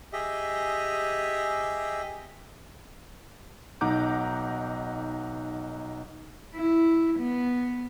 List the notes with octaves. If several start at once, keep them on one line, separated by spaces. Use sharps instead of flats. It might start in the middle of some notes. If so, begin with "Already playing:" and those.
G4 G#4 D#5 E5
B1 D#4 F#5 A#5 D6 G6
E4
B3